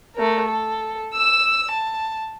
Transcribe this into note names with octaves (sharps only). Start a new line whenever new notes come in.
A3 A#4
A4
E6 E7
A5